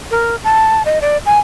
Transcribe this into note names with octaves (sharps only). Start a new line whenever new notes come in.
A#4
A5
D#5
D5
G#5